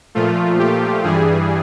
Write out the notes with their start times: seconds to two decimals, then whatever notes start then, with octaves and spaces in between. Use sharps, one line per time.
0.15 A#2 F3 A3 F4
0.59 G4
1.04 G2 E3 G3 G#4